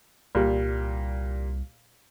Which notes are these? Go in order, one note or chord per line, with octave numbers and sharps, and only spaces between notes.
C2 A#2 G3